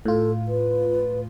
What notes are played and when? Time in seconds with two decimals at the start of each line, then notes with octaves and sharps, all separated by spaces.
0.05 A2 F4 A4
0.48 B4